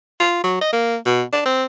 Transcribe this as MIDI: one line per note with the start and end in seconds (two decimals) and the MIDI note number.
0.20 0.41 65
0.44 0.57 54
0.61 0.72 75
0.73 0.96 58
1.06 1.23 47
1.33 1.43 62
1.46 1.65 60